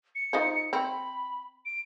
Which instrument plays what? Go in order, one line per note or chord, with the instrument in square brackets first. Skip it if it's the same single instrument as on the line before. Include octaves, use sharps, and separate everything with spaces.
[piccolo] C#7
[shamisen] D#4 F4 C5
[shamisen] C4 [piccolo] B5
[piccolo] D7